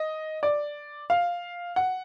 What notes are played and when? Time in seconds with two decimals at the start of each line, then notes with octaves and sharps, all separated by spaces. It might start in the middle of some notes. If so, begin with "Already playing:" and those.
Already playing: D#5
0.43 D5
1.10 F5
1.76 F#5